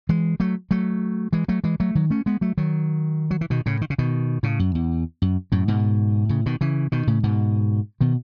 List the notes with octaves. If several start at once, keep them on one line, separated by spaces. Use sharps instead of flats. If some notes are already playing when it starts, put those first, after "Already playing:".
E3 G#3
F#3 A3
F#3 A3
E3 G#3
F#3 A3
E3 G#3
F#3 A3
D#3 F#3
A3 C#4
G#3 B3
F#3 A3
D#3 F#3
F#3
E3
B2 D#3
A2 C#3
D#3
C#3
B2 D#3
A2 C#3
F#2
E2
F#2
F#2 A2
G#2 B2
A2 C#3
B2 D#3
C#3 E3
B2 D#3
A2 C#3
G#2 B2
B2 D#3